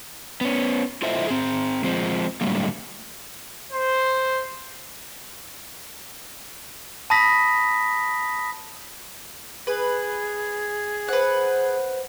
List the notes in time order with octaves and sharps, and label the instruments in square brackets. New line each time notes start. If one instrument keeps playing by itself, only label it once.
[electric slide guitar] B3 C#4
E4 F4 A4 C5 D#5 E5
C4 G#4
F3 G#3 C4
A2 D3 F#3 G3 A3 A#3
[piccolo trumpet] C5
[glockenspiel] A5 B5 D#6 A#6 B6
[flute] G#4 [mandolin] B4
[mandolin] B4 F#5 [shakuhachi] C5